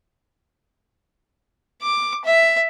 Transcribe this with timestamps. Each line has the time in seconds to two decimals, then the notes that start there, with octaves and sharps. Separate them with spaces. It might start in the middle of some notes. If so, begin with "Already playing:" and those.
1.82 D6
2.25 E5